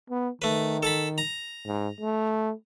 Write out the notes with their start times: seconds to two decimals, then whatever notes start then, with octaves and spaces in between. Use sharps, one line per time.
0.10 B3
0.42 D#3 A3 B4
0.83 A4 A5 B5
1.18 A#5
1.66 G#2
2.01 A3